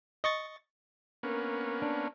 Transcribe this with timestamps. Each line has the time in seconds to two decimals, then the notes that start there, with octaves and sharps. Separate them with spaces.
0.24 D#5 C#6 A6
1.23 A#3 B3 C#4 D4 A#4
1.82 D4